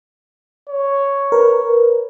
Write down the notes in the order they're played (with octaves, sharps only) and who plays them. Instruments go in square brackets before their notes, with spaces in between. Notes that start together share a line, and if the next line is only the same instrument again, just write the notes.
[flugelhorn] C#5
[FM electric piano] A#4 B4